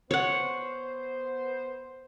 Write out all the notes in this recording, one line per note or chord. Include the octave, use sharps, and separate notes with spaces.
B3 C5 C#5 F#5